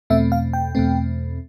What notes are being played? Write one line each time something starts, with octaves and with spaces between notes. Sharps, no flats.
E2 B2 A3 C4 E5
F5
G5
E2 B2 A3 C4